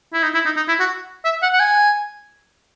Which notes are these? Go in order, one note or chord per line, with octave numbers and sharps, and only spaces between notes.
E4
D#4
E4
D#4
D#4
E4
F#4
E5
F#5
F#5
G#5